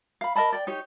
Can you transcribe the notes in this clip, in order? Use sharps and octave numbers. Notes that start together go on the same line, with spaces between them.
F5 B5
A#4 D#5 A5 B5
D5 G5
D#4 G4 C#5